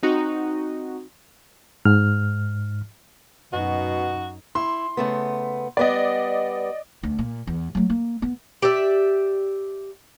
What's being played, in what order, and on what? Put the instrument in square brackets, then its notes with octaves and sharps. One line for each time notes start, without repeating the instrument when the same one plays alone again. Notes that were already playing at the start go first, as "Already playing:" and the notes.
[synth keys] C4 D#4 F#4
[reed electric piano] G#2 F6
[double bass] F#2 D#4 [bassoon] B2 [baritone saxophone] F#4
[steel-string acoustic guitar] E4 [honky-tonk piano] C6
[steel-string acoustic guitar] C#3 A3 B3
[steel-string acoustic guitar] G3 B3 [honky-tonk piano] D5 D#5
[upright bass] D2
A#2
E2
F#3 A3
A#3
B3
[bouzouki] G4 D5 E5